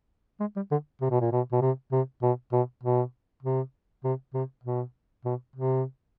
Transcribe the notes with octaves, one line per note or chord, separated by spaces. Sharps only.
G#3
G3
D3
C3
B2
A#2
B2
B2
C3
C3
B2
B2
B2
C3
C3
C3
B2
B2
C3